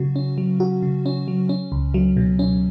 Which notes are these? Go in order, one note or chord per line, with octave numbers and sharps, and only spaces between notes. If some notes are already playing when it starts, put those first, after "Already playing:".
Already playing: C#3 F#3 F#4
C#4
F#3
F#4
C#3
C#4
F#3
C#4
C#2
F#3
B2
C#4